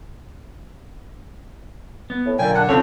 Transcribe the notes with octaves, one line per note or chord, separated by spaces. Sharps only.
B3
A2
B1 A#2 D3 G5 G#5
D4 F#5
F2 C#3 C4 A4 C#5